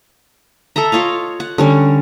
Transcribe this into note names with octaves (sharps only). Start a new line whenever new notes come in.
A4 D#5 E5 A#5
F4 C#5 D#5 F5
F#5
D3 G3 C#4